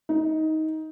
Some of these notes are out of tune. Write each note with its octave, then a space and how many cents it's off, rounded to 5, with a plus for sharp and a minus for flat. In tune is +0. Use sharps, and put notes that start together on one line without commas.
D#4 +15